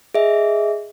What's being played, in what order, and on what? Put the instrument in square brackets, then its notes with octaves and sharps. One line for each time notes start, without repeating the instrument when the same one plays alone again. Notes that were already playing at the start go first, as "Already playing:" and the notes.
[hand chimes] G#4 D#5 E5